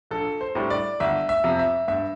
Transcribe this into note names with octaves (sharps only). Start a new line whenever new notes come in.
A#1 A4
C5
A2 G3 D4
D5
G1 E5
E5
F2 C3
E5
G2 E5